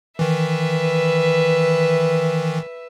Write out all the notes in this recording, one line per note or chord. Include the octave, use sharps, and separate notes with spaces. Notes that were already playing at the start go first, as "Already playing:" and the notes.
D#3 E3 B4 E5